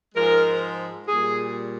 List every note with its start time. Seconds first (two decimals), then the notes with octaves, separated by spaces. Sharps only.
0.14 G#2 F3 G#3 A#4
1.07 A#2 G3 G#4